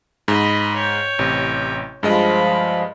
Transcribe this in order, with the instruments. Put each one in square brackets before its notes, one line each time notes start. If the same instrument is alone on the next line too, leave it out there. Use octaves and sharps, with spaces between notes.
[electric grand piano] G#2 [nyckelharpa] D#5 B5
[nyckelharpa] C#5 G5
[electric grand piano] A1 C3
[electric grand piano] G2 G#3 D#5 [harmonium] F3 [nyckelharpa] F4 B5